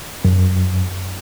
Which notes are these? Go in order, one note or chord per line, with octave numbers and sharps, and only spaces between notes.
F#2